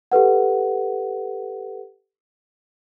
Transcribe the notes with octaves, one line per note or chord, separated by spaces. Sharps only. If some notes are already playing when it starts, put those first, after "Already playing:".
G4 A4 B4 F#5